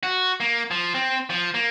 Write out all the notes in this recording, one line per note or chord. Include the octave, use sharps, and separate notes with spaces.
F#4
A#3
F3
C4
F3
A#3